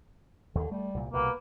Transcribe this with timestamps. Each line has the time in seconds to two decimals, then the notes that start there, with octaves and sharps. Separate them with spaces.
0.55 D#2 D3
0.71 G3 A3
0.94 C2 A#2
1.14 C2 B2 A#3 B4